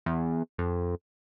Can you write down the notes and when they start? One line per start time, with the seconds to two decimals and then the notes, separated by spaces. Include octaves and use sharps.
0.06 E2
0.58 F2